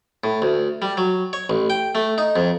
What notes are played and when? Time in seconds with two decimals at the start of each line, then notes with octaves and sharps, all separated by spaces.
0.24 A2
0.42 D2
0.82 G3
0.97 F#3
1.33 C#5
1.50 A1
1.70 G5
1.95 A3
2.18 D#4
2.36 F2